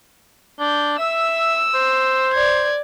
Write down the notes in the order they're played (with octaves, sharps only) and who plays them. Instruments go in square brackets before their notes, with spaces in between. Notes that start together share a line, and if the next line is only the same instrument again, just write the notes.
[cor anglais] D4 [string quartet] G6
[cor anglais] E5 [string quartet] E6
[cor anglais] C5
[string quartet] D5 G#6